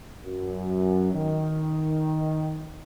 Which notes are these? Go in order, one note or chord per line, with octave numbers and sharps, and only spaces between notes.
F#2
D#3